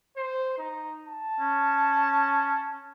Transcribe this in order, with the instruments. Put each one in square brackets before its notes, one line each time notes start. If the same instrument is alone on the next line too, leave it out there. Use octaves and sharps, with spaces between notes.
[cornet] C5
D#4
A5
[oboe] C#4